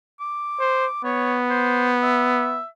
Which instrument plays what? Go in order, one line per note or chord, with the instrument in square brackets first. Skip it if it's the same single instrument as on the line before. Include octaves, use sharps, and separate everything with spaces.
[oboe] D6
[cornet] C5
[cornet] B3 [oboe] C#5
[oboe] C5
E5